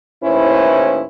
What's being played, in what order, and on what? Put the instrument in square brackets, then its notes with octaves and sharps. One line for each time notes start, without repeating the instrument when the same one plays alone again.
[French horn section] D#2 A2 C#4 E4 B4 C5